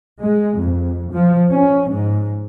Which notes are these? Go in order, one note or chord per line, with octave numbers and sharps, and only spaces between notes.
G#3
F2
F3
C#4
G#2